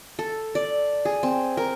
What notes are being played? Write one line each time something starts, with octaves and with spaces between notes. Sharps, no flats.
A4
D5
G#4
C4
A#4